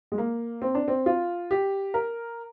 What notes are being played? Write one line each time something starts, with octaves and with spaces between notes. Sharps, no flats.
G#3
A#3
C4
D4
C4
F4
G4
A#4